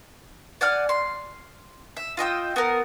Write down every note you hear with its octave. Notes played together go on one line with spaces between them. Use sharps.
D5 F#5 G#5 F6
C6
E5
F4 D#5 G5 E6
B3 A#4